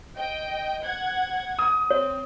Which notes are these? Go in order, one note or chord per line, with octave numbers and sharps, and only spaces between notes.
D#5 G5
F#5 G#6
D#6
C4 C#5